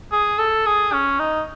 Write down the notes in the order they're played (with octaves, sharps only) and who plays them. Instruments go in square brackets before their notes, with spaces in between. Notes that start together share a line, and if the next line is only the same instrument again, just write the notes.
[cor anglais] G#4
A4
G#4
C#4
D#4